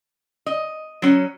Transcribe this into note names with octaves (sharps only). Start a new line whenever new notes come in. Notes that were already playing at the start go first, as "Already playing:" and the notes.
D#5
F#3 C#4